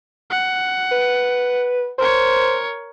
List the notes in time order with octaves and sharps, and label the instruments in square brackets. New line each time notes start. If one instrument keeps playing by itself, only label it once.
[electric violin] F#5
[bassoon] B4
[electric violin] A#4 C#5 [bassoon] C5